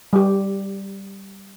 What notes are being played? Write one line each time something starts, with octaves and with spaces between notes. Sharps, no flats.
G3 G4